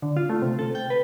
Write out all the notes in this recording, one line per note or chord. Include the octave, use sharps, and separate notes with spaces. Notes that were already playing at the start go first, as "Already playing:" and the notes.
D3
F4
A3
C3
A4
G5
B4